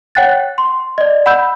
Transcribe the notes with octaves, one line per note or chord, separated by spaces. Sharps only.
C#5 F#5 G5 F#6 A6
C6
D5 D#5
F#5 B5 E6 G6